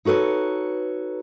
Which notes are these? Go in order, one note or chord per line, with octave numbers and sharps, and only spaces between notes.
D#4 F#4 A4 B4 C#5